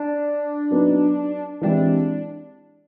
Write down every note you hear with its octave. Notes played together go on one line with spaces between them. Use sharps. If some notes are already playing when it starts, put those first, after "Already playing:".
Already playing: D4
F#3 B3 D#4
E3 G#3 C4 D4 E4 G4